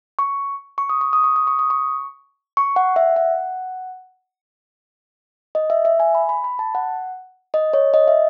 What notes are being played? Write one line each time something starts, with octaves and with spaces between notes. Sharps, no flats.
C#6
C#6
D#6
C#6
D#6
C#6
D#6
C#6
D#6
C#6
C#6
F#5
E5
F#5
D#5
E5
E5
G#5
B5
B5
B5
A5
F#5
D#5
C#5
D#5
E5